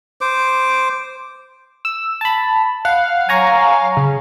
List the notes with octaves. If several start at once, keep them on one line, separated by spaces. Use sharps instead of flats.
C5 D6
E6
A5 B5
F5 F#5
F#3 G#5 A#5 C#6
C#3